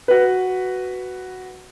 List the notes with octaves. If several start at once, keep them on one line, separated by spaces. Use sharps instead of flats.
F#4 B4